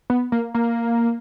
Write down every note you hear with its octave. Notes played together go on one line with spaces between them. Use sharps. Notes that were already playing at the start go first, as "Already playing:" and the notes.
B3
A#3
A#3